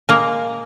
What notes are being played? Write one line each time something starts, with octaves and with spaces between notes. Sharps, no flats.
A#2 G#3 A#3 A#4